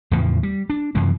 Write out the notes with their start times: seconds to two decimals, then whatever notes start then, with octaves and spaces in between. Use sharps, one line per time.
0.11 E2 A2 C#3 F3
0.43 G3
0.70 D4
0.95 F#2 C3 E3 F3